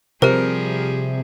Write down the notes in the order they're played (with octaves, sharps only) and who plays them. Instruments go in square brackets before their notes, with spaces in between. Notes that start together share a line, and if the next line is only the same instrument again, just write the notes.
[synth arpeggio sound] C3 [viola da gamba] F3 G3 G#4 [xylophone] G4 C5 [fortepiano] A#4